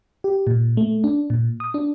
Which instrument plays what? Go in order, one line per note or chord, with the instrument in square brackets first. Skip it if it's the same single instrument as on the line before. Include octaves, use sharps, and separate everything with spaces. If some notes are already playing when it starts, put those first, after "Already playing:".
[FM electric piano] G4
A#2
A3
D4
A#2
D#6
D4